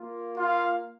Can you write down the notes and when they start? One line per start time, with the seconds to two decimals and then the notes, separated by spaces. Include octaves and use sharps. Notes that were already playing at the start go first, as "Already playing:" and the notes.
Already playing: A#3 F4
0.38 F4 F5